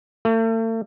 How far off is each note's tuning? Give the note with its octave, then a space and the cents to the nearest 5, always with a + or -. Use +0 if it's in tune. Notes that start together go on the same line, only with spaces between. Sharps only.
A3 +40